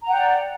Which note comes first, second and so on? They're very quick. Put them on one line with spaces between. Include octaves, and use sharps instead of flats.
A#5 F#5 G5 D5